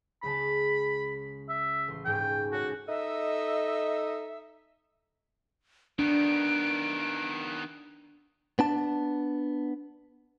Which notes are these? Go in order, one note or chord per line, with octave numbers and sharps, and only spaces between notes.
C#2 C#3 A5 B5
E5
A1 C6
D#1 G#2 C#4 G5
F#4 A4 C#5
D#4 A4 D#5 E5
D#3 B3 D4 D7
B3 D4 A5